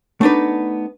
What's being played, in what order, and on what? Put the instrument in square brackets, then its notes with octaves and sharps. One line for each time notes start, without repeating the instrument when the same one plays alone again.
[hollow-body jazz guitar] A3 B3 D4 D#4 B4